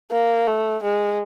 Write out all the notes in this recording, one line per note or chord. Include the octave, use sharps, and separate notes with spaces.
A#3
A3
G#3